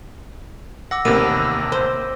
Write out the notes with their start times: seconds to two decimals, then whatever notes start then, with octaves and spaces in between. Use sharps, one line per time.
0.91 F#5 D6 E6 A#6
1.05 A1 D#2 C3 A#3 B3 D6 D7 D#7
1.72 C5